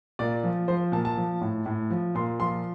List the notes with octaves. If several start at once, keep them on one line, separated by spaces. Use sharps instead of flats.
A#2 D5
F3
F3 C5
A#2 A5
A5
F3
A2
A2
F3
A#2 C6
F3 C6